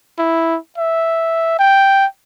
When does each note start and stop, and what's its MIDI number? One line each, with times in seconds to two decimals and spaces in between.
0.18 0.57 64
0.78 1.56 76
1.59 2.06 79